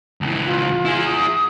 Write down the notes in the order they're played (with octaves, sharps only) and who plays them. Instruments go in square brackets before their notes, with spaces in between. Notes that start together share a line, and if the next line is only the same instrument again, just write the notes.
[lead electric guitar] C#2 E3
[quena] F4
[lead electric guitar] E4 G#4
[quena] D#6